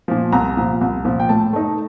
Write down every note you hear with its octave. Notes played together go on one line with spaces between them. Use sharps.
A#2 F3
C2 A#5
A#2 F3
C2
A#2 F3
G5
A2 A5
A3 D#4